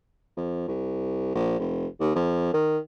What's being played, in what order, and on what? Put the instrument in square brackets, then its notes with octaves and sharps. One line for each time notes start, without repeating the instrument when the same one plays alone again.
[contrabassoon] F2
C2
A#1
F1
D#2
F2
D#3